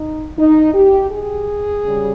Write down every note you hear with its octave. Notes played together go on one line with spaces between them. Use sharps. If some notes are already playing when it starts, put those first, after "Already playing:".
Already playing: D#4
D#4
G4
G#4
C#3 G3